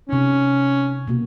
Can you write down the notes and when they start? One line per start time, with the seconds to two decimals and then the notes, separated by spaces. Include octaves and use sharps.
0.09 C3 C#4 D#4
1.07 B2 A#3 F#4